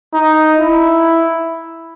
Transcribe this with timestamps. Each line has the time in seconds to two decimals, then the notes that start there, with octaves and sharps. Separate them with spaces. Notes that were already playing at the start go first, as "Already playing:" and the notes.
0.14 D#4
0.58 E4